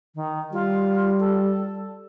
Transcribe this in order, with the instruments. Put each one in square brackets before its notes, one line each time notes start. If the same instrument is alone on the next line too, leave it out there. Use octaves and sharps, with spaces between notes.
[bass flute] D#3
[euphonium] G3 [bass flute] F4
[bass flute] A4